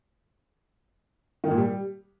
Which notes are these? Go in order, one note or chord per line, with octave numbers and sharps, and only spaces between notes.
D#3
A#2
G3